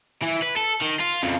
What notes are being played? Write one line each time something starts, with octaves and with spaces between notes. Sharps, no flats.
E3
B4
A4
D#3
F4
F2 C#3